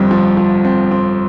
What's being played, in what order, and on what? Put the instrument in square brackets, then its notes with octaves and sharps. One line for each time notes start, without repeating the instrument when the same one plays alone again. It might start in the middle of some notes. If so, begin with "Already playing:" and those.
Already playing: [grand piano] G1 F2 C4 [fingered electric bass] G3
[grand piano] F3
F3
C4
C4